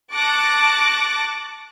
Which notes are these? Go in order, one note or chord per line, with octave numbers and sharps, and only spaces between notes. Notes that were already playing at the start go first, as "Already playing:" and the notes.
A5 C#6 D6 F#6 A6 A#6